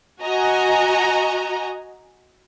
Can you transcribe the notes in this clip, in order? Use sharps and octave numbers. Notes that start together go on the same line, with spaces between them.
F#4 D#5 G#5 A#5